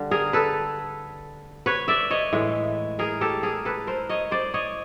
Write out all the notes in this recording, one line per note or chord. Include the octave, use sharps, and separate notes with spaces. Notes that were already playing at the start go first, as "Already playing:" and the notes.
Already playing: D3 G3
G#4 A#4
A4 B4
B4 C#5
D5 E5
C#5 D#5
A2 E3 G#3
G#4 A#4
G4 A4
G#4 A#4
A4 B4
A#4 C5
C#5 D#5
C5 D5
C#5 D#5